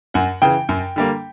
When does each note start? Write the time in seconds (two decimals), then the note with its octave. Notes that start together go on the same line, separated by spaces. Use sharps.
0.14 F#2 F#5
0.42 C#3 E3 G5
0.69 F#2
0.96 D3 G3 A#3